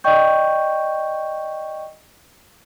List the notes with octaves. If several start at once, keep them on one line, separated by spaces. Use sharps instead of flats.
D5 D#5 G5 C#6 G6